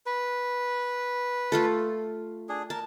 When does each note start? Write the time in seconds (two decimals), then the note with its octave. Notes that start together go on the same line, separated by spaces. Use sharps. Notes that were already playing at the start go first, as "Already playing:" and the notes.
0.06 B4
1.52 A3 F4 A4
2.49 D4 G#4
2.70 A#4 A5